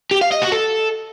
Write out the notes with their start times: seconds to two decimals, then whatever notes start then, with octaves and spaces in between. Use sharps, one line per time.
0.11 G4
0.21 F5
0.32 D#5
0.42 F#4
0.52 A4